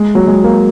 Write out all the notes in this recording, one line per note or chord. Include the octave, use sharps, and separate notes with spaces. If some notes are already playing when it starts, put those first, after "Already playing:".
Already playing: G#3
F#3
G#3
A#3